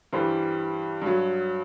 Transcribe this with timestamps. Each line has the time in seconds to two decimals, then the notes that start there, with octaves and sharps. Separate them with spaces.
0.13 G2 E3 G3 C5
1.02 G2 F#3